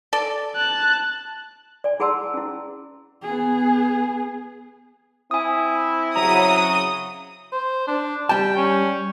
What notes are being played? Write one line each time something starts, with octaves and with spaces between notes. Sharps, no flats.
A4 D5
A5 F#6
D5 G#5
E4 G#4 F#5 A5 C6 E6
C#4 E4
B3 G#4
C4 E4 G#5 D#6
C#3 F#3 A#5 D#6
C5
D4
G3 G5 A5
C#4